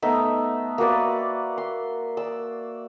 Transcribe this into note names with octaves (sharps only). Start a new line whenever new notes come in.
A3 B3 D#4 E5
A#3 F#4 B4 D5
C6
D5 E6